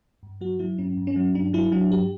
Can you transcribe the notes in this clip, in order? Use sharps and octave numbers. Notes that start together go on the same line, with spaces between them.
G2
F#3 F#4
F#3 E4
G2 C#4
G2
C#4
F#3
G2 D4
F#3 E4
F#3 D4
G2 G4